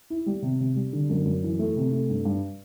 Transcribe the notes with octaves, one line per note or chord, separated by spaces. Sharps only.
E4
G3
C3
C3
G3
D3
F#2
F#2
E3
A3
C3
A3
G2
G2